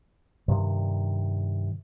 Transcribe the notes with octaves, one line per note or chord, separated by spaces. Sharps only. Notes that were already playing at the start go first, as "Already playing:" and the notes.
G2 C3 D#3